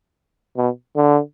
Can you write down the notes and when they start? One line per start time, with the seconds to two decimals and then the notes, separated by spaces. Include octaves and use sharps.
0.57 B2
0.96 D3